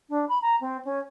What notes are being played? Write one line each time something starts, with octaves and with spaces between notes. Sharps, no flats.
D4
B5
A#5
C4
C#4